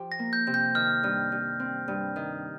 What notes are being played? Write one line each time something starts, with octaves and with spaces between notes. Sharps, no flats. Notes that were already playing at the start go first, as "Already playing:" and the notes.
Already playing: F3 G4
A#6
A#3
G6
C3
G6
D#3 F6
G2
G2
C4
G2
D#3